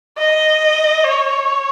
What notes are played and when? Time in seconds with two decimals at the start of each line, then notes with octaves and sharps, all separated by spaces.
0.19 D#5
1.05 C#5